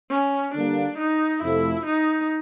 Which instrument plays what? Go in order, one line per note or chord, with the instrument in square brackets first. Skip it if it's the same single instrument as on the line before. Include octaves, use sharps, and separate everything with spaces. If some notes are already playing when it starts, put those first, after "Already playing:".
[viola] C#4
[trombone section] D3 G3 A#3 [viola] D4
[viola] D#4
[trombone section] F2 C3 F3 A3 [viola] E4
[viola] D#4